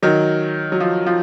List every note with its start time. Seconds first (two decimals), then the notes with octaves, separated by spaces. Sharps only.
0.03 D#3 F#3
0.72 F#3
0.80 F3
1.06 F3